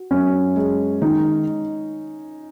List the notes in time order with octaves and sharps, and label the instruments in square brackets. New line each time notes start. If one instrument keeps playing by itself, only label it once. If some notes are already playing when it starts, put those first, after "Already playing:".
Already playing: [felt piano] F#4
[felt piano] F#2 [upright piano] C#4
[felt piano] G#3
[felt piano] D#3 [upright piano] D#4